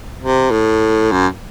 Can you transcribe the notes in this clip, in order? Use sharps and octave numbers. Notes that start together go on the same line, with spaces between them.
C3
A2
F#2